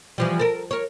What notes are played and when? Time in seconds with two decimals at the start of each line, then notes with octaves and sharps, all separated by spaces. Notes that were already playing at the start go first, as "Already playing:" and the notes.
0.18 E3 F3 G3
0.39 A4 A#4
0.71 A#4 C#5